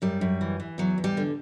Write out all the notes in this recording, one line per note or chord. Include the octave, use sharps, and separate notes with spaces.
F#2 G3
F#2
E3
E3
E2 F#3
E2
G3
D3